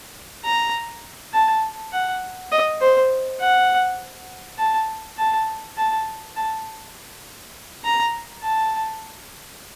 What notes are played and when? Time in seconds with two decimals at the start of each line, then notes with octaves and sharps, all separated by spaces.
0.45 A#5
1.34 A5
1.93 F#5
2.52 D#5
2.81 C5
3.41 F#5
4.59 A5
5.18 A5
5.77 A5
6.36 A5
7.84 A#5
8.43 A5